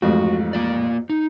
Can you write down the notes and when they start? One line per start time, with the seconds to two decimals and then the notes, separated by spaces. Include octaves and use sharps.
0.02 A1 F2 G#2 F#4
0.53 A#3 F4 D5
1.09 D#4